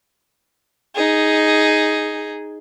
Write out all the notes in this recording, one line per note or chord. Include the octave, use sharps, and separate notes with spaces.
D#4 G#4